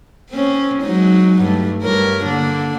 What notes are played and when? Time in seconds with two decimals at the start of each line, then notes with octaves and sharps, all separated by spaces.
0.30 A#3 C4 C#4
0.82 F#3 G#3 D#4
1.43 G2 A3
1.81 G2 A#4 C#5
2.25 D3 A#3 D4